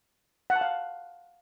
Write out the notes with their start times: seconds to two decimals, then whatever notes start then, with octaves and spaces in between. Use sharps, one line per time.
0.50 F#5
0.56 A5
0.61 F5